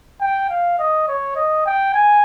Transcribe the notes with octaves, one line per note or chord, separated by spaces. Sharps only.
G5
F5
D#5
C#5
D#5
G5
G#5